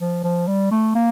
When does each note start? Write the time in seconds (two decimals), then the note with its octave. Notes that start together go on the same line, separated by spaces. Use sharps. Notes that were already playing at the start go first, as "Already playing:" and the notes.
0.01 F3
0.23 F3
0.47 G3
0.71 A3
0.95 A#3